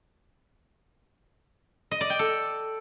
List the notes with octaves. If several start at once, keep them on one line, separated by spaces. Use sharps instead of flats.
D#5
D5
G5
A4